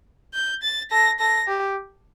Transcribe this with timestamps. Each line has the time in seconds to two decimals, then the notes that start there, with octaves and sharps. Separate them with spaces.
0.34 G6
0.63 A6
0.91 A4 A#6
1.20 A4 A#6
1.48 G4